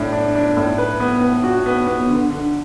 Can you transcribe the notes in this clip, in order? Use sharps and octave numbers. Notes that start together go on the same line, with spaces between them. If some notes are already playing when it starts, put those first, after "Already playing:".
Already playing: A2 D4
D4
D4
A2
B4
B3
B3
F#4
B3
B3
D3
D3